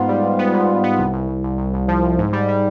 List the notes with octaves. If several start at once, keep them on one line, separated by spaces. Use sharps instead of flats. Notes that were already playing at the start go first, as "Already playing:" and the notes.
Already playing: G#2 B3 F4
G3
G#2
B3
G#2
G#2
B3
C2
C2
C2
C2
C2
C2
F3
C2
G#2
G3
G3